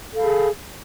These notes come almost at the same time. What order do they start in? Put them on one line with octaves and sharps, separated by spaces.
A4 F5 B5 G#4